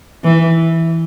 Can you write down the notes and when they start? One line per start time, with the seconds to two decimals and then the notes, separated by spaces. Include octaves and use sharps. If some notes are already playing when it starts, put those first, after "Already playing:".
0.24 E3